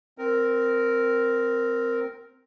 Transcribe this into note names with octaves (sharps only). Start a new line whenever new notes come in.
C4 A#4